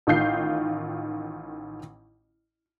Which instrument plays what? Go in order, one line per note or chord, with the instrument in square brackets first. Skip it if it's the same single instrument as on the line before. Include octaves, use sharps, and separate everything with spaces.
[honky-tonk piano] A1 D#3 F4 G6 C7